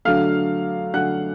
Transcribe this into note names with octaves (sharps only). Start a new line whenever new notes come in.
D3 F#3 A3 F5 F6
D3 F#3 A3 F#5 F#6